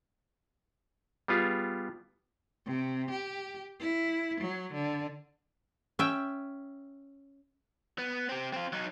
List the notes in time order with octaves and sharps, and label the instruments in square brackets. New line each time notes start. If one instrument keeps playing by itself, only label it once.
[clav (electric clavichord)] G3 B3 F4 G4 G#4
[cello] C3
G4
E4
F#3
D3
[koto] C#4 E5 G5
[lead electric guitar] B3
C4 G4
C4 F4
F#3 D#4